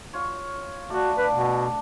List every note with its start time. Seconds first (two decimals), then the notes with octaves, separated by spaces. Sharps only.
0.14 F4 C#5
0.90 A3 F#4 D5
1.18 D4 B4
1.32 B2 F#5